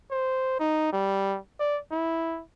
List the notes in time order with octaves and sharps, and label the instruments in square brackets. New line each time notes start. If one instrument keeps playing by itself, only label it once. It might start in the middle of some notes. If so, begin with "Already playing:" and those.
[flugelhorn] C5
D#4
G3
D5
E4